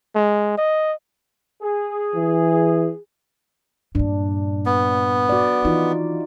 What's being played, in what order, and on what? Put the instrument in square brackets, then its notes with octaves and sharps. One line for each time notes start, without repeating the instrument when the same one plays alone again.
[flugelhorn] G#3
D#5
[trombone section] G#4
[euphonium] E3
[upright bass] G2 A#2 [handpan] D4
[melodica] B3
[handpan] F#4 D5
[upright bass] E3 [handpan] D#4 F4